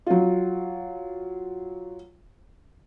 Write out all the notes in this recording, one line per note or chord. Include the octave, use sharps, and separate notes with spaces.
F#3 F4